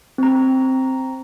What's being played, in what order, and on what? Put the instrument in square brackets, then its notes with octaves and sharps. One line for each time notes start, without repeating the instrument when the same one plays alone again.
[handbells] C4 A#5